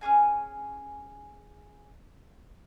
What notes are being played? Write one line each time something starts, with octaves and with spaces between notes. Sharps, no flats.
C#4 D4 G#4 G#5